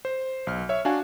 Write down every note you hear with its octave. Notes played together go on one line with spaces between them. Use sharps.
C5
B1 F6
C#5 E5
D4 F#4 F5 G#5